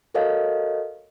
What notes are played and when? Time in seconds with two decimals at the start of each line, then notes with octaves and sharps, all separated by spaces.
0.14 F#4 A4 A#4 C#5 D#5 F5